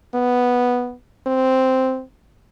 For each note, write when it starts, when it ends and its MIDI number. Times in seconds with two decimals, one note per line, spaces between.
0.14 0.94 59
1.27 2.02 60